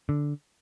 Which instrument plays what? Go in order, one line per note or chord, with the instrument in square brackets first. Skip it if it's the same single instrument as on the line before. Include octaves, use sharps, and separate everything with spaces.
[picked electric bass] D3